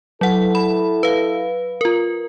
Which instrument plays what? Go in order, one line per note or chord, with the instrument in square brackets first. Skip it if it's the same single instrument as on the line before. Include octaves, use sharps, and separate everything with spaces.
[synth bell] F#3 F#5 [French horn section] E4 A4
[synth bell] B5
B4 F5
F4 A#4